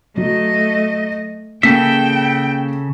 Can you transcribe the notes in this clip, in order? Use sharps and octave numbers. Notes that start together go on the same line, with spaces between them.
F#3 A3 D#5
C#3 A#3 A4 E5 G5